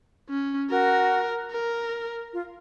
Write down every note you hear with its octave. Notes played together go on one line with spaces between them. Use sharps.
C#4
F#4 A#4
A#4
F4